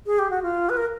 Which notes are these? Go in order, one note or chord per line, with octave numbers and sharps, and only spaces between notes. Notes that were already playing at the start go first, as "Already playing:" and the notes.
G#4
G4
F#4
F4
B4
A#4